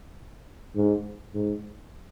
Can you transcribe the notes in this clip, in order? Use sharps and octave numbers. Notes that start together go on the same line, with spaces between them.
G#2
G#2